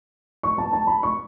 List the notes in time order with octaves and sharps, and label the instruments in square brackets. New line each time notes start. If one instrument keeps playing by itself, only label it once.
[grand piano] C#6
A5
A5
B5
C#6